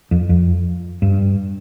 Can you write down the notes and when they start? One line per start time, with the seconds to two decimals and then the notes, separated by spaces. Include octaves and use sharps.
0.11 F2
0.29 F2
1.02 G2